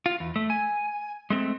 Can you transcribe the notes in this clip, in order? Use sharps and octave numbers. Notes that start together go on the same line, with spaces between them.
F4
E2
A3
G#5
G#3 A3 C4